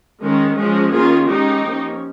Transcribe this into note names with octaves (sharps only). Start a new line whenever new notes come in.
D#3 G#3 C#4
F3 G#3 C#4
D#3 A#3 C#4 F4 G#4
D#3 G#3 C#4 D#4 G4
F3 A#3 C#4